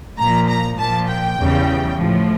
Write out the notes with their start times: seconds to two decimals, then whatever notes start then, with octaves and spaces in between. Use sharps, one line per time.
0.19 A#2 F3 A#5
0.48 A#5
0.78 A#2 F3 A5
1.08 G5
1.37 E2 C#3 E3 G3
1.97 A2 F3